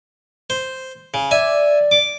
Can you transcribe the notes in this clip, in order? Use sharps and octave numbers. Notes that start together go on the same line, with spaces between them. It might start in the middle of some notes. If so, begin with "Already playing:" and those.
C5
C#3
D5 E5 G#5
D6